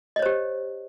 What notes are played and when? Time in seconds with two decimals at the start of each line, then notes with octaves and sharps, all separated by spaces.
0.16 D#5
0.19 C#5
0.22 C5
0.26 G4